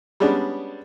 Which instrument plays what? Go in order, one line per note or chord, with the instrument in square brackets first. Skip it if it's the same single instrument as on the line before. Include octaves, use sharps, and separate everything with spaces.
[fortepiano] G3 G#3 B3 C#4 D4